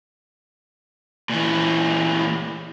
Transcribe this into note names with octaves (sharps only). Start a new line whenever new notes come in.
A#2 E3